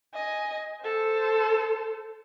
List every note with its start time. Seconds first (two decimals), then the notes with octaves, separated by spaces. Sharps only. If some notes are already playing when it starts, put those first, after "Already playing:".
0.14 D#5 G#5
0.82 A4 C5